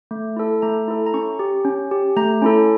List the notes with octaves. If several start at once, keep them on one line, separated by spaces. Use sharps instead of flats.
A3
E4 A4
A3 A#5
E4 A4
A#5
C#4 C#6
G4
C#4
G4
A3 A#5
C#4 E4 A4